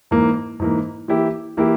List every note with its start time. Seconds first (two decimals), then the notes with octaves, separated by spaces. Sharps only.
0.11 G#2 E3 A#3
0.60 G#2 E3 A#3
1.08 E3 A#3 E4 G4
1.57 E3 A#3 E4 G4